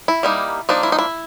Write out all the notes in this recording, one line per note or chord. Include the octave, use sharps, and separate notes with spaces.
E4
G3 A#3 D#4
F3 A#3 D4 D#4
E4
D#4
E4